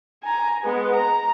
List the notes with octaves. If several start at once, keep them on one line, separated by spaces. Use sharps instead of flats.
G#5 A#5
G#3 B3
A#5